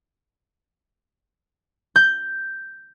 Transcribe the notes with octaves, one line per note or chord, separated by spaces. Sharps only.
G6